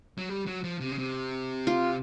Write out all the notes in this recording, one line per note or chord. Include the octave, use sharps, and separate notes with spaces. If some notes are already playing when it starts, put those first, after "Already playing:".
F#3
G3
F#3
F3
C3
C#3
C3
F4